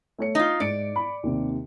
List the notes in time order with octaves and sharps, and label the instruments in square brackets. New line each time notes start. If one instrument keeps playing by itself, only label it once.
[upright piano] A3 C#5 C#7
[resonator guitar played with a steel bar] D#4 F4 [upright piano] D#5
[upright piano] G#2 C#7 D7 [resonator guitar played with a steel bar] D5
[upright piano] B5
D#2 C3